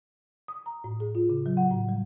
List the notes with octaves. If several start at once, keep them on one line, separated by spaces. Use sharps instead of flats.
D#6
A#5
A2
G#4
F4
C#3
F#3
F#5
A2
G3